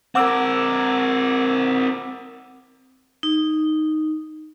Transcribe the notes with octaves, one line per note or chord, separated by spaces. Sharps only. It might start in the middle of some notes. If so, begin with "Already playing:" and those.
C4 A#4 F#5 D6 E6
D#4